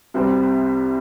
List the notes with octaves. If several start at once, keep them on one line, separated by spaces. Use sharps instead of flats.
C2 C3 G3 C4